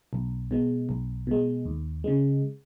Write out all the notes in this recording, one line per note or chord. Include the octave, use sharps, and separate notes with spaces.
B1
B2 G#3
B1
B2 G#3
D#2
C#3 G#3